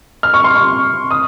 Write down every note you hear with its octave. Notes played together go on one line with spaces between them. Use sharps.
F6
C#6
C6
C#6
D#6